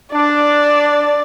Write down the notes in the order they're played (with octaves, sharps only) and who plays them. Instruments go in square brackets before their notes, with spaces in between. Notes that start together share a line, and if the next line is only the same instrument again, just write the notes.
[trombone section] D4 [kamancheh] D5